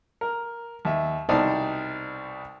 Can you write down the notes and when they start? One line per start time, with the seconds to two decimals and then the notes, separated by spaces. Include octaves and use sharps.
0.21 A#4
0.85 D#2 E5
1.29 C2 B2 D#4 C5 D5 A5